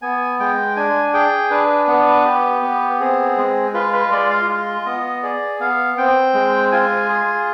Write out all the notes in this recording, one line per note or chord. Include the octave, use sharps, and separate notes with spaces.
B3 G#5
G#3 G5
D4 G#5
G#4 G5
D4 B4
B3
G4
B3
C4 G#4
G#3
F4 B4
B4
G#3 D5
F5
F4
B3 D#5
G#4 D5
B3 F5
C4 G5
G#3
F4 G#5
G#4